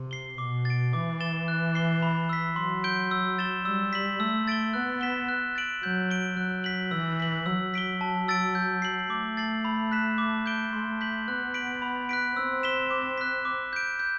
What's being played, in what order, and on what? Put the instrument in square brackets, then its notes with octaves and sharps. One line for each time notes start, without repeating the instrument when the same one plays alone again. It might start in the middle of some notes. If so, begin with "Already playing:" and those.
Already playing: [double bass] C3
[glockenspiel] C7 G7
[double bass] B2 [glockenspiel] D6
[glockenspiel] A6
D7
[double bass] E3 [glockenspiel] D6
[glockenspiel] A6 E7 G7
F#6
C7 G7
B5
E6 B6
[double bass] F#3 [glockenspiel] C6
[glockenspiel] G6 D7 G7
E6
A6 E7 G7
[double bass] G3 [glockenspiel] E6
[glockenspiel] B6 F#7
[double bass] A3 [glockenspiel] E6
[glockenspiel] A6 D7 G7
[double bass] B3 [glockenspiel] F#6
[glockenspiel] B6 E7 G7
F#6
A6 D7 F#7
[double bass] F#3 [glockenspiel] G6
[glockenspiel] D7 G7
[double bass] F#3 [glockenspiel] F#6
[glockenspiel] B6 F#7
[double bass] E3 [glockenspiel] E6
[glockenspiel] B6 F#7
[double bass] F#3 [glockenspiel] E6
[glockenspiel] B6 D7 G7
A5
E6 A6 D7
G6
C7 F#7
[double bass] A3 [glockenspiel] D6
[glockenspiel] A6 C7 F#7
B5
F#6 B6 E7
D6
G6 D7 G7
[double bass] A3 [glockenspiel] C6
[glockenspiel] G6 B6 F#7
[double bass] B3 [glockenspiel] F#6
[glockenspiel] B6 D7 F#7
B5
F#6 B6 D7
[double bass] C4 [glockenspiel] E6
[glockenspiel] B6 E7 G7
D6
F#6 B6
D6
G6 D7
G6